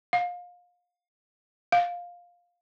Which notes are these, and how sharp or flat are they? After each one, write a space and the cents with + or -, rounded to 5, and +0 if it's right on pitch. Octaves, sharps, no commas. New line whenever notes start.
F5 +30
F5 +10